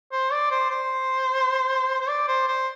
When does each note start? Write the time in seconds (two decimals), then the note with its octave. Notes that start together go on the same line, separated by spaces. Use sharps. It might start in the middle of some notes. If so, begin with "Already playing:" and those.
0.12 C5
0.32 D5
0.51 C5
0.70 C5
2.00 C5
2.08 D5
2.28 C5
2.47 C5